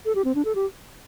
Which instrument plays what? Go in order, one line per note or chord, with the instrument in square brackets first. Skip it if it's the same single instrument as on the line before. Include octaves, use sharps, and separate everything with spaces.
[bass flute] A4
G4
C4
D4
A4
G4